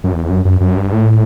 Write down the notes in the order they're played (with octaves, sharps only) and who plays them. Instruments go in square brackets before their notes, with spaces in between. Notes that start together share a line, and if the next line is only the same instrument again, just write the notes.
[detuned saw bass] F#2
E2
F#2
F#2
F#2
G2
A2